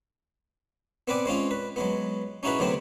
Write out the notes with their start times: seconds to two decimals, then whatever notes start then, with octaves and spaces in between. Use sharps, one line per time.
1.08 B3 C4 B4 D5 G#5
1.26 G#3 C4 C#4 F4
1.51 B4
1.76 F#3 G#3 B3
2.43 C#4 D#4 E4 F#4 G#4 B4
2.59 D2 C3 F#3 B3 C4